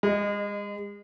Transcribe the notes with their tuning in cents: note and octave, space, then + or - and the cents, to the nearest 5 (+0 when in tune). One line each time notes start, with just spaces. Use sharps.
G#3 -35 D#5 -15